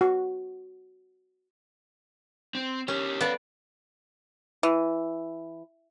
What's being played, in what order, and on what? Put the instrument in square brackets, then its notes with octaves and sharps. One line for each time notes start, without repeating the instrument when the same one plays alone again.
[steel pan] F#4
[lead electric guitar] C4
[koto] C#4 [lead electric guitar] G4 A#4
[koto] B3 D5 [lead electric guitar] A4 F5
[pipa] E3